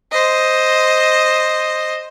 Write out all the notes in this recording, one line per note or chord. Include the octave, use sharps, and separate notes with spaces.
C5 D#5